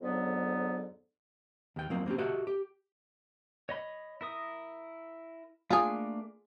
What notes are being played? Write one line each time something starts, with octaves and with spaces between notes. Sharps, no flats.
F2 G#2 D3 F#3 B3
D#2 G5
F3 F#3 A#3 C4
A#3 C4 C#4 G4
F#4 G4 A4 D#5 E5
G4
C#5 D#5 B5
E4 A#4 D#6
A3 A#3 D4 F4 G#4